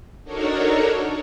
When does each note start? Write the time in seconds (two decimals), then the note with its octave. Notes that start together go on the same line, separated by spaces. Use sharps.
0.24 D4 D#4 F#4 A4 A#4 C#5